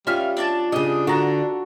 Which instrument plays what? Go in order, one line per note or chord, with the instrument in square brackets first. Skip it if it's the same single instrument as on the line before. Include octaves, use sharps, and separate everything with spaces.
[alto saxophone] G3 [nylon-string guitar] C#4 [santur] F4 [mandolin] E5 F5 F6
[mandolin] D4 D5 A5
[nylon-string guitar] C#3 G3 [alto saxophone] D4 [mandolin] D#5
[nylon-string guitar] D3 [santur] F#4 [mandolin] A5 A#5